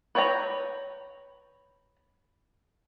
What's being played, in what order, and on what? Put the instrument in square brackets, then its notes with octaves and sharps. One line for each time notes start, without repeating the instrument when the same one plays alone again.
[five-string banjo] B4 C#5 G5 A5 A#5